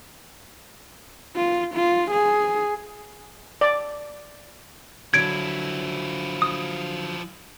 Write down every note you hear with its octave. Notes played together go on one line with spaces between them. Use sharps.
F4
F4
G#4
D5
D3 F3 F#3 E4 G#6 D7
D#6